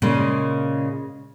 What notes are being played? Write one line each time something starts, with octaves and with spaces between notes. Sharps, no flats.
A#2 C#3 G#3 A#3